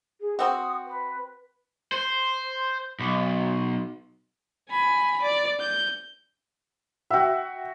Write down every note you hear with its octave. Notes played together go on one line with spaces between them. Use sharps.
G#4
C4 F#4 D#6
B4
C5
B1
G#5 B5
D5
G6
F#4 E5 F#5 G5